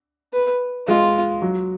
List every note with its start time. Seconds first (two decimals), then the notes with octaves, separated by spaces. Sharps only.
0.34 B4
0.88 G#3 F4
1.42 F#3